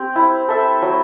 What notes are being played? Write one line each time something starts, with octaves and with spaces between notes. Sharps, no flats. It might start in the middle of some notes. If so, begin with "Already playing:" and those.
Already playing: C4 G4
E4
A4 E5
F#3